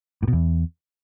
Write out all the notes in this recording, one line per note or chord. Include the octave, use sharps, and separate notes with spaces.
A2
B2
E2